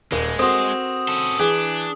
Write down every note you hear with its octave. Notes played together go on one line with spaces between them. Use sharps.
D#1 G#3 A#4
C4 F#4 A4 C6 D#6
C#4 A4 C6
E3 D4 G#4 G#5